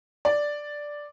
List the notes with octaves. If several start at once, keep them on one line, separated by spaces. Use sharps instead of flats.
D5